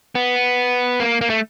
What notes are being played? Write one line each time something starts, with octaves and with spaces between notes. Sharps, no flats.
B3
A#3
A#3
A3